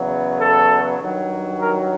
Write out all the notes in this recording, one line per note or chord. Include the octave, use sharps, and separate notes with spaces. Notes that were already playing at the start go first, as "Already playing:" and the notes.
Already playing: E2 C#3 F#3 B3
A4
G2 D#3 F#3
A#4